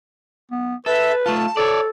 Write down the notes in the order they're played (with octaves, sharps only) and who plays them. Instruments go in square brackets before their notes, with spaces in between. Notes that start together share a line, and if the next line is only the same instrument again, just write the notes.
[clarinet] B3
[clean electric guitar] A4 [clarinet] B4 [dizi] E5
[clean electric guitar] A3 F4 [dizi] A5
[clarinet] A4 [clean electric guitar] C#5 D5